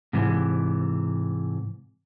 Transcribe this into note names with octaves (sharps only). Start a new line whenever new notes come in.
G#2 C3 E3